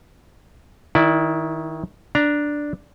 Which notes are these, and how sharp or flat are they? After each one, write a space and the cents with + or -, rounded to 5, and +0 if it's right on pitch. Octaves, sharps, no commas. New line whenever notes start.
D#3 +20 E4 -5 D5 +20
D4 +0 A#5 +10